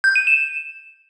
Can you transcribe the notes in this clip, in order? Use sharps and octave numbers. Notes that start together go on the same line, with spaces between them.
G6
D#7
E7